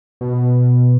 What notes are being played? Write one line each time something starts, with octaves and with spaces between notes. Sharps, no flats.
B2